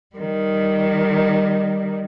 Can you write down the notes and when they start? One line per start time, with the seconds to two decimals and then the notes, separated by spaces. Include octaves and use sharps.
0.16 D#3 G3